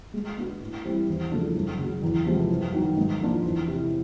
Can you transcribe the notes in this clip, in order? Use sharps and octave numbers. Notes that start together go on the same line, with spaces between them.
G#3
B3 D4 F#4
A2
E3 G3 C4 E4
E2
C#3 F3 A3 D4
F#2
C#3 F#3
E2
C3 F3 G#3 B3
F#2
D#3 F#3 B3 D#4
G#2
F3 A#3 D4 F4
E2
C3 E3